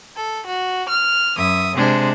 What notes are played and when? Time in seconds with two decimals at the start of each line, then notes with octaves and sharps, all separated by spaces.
0.14 A4
0.44 F#4
0.88 F6
1.37 F#2 E5 D#6
1.75 C3 G#3 D4 G#4 C5